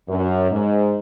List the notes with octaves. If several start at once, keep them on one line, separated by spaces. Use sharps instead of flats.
F#2
G#2